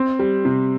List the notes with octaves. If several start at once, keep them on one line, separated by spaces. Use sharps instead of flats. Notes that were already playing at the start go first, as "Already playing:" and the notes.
Already playing: C4
G3
C3